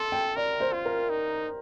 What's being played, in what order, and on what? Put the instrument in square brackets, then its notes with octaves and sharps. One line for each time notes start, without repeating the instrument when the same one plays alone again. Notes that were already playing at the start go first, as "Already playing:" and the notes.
Already playing: [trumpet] A4 [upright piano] C6
[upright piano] G5
[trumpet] A#4 [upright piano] D5
[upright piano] C5
[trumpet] F4
[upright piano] A#4
[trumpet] D#4